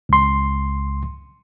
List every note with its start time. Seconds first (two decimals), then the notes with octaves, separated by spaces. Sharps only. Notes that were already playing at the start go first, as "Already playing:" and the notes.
0.09 C#2 C6